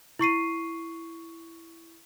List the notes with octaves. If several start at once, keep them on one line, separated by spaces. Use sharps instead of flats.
E4 C#6 C7 D#7